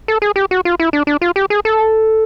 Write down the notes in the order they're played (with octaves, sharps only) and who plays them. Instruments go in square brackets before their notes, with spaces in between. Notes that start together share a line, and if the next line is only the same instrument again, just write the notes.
[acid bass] A4
G#4
G4
F#4
F4
E4
D4
D4
F4
G4
G#4
A4